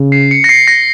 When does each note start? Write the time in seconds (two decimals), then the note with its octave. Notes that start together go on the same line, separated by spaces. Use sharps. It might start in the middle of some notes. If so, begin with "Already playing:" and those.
Already playing: C#3
0.12 C7
0.31 C#7
0.44 A#6
0.49 C7
0.67 A#6